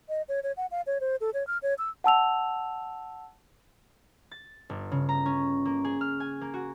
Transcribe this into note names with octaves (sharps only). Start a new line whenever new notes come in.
D#5
C#5
C#5
F#5
F5
C#5
C5
A4
C#5
F6
C#5
E6
F#5 A5 E6 F7
A6
G1
C#3
A#5
C#4
A#3
G#4
F6
G#5
A#3
F#4